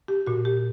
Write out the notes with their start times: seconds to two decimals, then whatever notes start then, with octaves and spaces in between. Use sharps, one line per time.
0.08 G4
0.27 A#2 F#4
0.45 G4